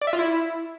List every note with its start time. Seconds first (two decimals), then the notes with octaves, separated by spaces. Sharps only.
0.01 D5
0.07 E5
0.13 F4
0.19 E4